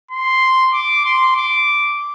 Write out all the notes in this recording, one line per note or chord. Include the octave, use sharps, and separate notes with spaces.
C6
D6
C6
D6